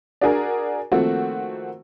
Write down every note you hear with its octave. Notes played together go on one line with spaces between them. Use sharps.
D4 F#4 G#4 A#4
D#3 F3 A3 A#3 C4 F#4